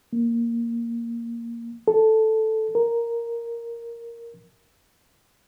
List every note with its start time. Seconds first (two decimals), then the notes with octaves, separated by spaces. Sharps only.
0.13 A#3
1.88 A4
2.75 A#4